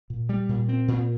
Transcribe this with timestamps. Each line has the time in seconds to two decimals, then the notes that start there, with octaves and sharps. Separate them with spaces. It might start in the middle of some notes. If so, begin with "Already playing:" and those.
0.10 A#2
0.29 G3
0.49 A#2
0.69 C4
0.88 A#2